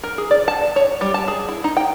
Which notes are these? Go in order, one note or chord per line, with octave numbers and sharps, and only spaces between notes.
A#4
G#4
D5
A5
C#5
G3
A5
G#4
E4
D#4
G5